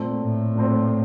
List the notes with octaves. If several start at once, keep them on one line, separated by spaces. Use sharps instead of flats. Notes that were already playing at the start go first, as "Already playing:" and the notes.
Already playing: A#2 A3 C4
A2
A#2 A3 C4